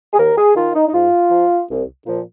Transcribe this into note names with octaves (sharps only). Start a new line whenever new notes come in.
G#4
D#2 A#4
G#4
D#3 F4
D#4
D#4
G#2 F4
F3
C2
A#2 F3